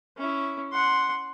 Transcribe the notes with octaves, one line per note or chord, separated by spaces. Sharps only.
C#4 E4
F#5 C6